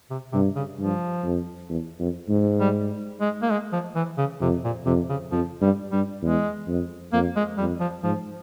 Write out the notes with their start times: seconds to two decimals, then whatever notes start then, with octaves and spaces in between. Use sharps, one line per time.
0.10 C3
0.33 G2 C3
0.56 C#3
0.78 G2 F3
1.24 F2
1.69 E2
1.99 F2
2.29 G#2
2.60 G3
3.21 G#3
3.42 A#3
3.50 G#3
3.72 F3
3.95 E3
4.18 C#3
4.41 F2 C3
4.64 A#2
4.86 F2 C3
5.09 C#3
5.32 F2 F3
5.61 G2 G3
5.92 G2 G3
6.22 E2 G#3
6.67 F2
7.13 F2 A#3
7.36 G#3
7.58 F2 G3
7.81 F3
8.04 G#2 F3